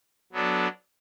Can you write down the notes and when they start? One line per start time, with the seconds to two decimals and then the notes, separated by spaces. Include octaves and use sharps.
0.33 F#3 B3 D4 A4